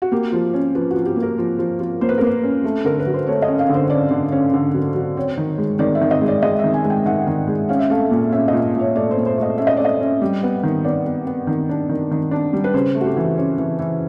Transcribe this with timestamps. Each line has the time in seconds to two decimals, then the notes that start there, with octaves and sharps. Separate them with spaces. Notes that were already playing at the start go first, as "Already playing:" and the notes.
0.02 F#4
0.12 A#3 G4
0.32 F3
0.54 C#4
0.75 F3 B4
0.90 F3 F#4
1.06 G4
1.16 A#3
1.23 A#4
1.38 F3
1.59 F3
1.80 F3
2.01 A#3 C5
2.09 B4
2.18 A#3 A#4
2.27 B4
2.43 C#4
2.64 A3
2.84 D3 A#4
2.99 B4
3.06 F#3
3.14 C5
3.27 A3 C#5
3.42 D#5
3.48 C#4
3.59 F5
3.69 D3
3.74 C5
3.90 C#4 D5
4.11 D3
4.32 C#4
4.54 D3
4.74 F#3
4.95 F#3
5.17 C4 C#5
5.37 D#3
5.58 G#3
5.79 D#3 D5
5.95 E5
6.01 D#3
6.11 D#5
6.21 G#3
6.28 D5
6.42 G#3 D#5
6.59 D#3 E5
6.74 G#5
6.84 G#3
6.90 G5
7.05 D#3 F#5
7.27 D#3
7.48 G#3
7.69 C#4 F5
7.79 E5
7.90 A3 F5
8.11 A#2
8.32 C#4 E5
8.48 A#2 D#5
8.74 A#2
8.79 C#5
8.95 A3 D5
9.11 C5
9.17 A#2
9.26 C5
9.37 A3
9.43 D#5
9.58 C#4 E5
9.67 D#5
9.77 A3 D5
9.85 D#5
10.00 C#4
10.22 G3
10.43 B3
10.63 D#3
10.84 B3 D5
11.06 B3
11.26 B3
11.47 D#3
11.69 D4
11.89 D#3
12.11 D#3
12.31 D4
12.53 G3
12.64 B4
12.74 C#3 C5
12.95 A3
13.01 F#4
13.06 G4
13.17 E3
13.37 C#4
13.58 E3
13.79 E3